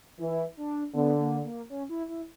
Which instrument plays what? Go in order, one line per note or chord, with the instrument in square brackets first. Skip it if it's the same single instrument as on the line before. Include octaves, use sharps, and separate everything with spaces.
[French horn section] E3 [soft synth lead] E4
[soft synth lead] D4
[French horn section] D3 [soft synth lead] B3
[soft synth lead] A#3
A#3
C#4
E4
E4